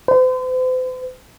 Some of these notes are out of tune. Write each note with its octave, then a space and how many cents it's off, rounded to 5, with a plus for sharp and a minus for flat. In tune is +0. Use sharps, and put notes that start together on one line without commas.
C5 -45